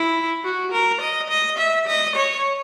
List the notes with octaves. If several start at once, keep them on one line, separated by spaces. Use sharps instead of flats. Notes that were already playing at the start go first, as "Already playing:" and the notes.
Already playing: E4
F#4
A#4
D#5
D#5
E5
D#5
C#5